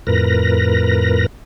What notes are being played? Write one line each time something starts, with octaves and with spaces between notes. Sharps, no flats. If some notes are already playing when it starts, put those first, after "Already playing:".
F2 A2 A#4 B4 A#6